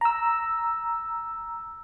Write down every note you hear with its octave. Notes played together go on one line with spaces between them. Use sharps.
A#5 E6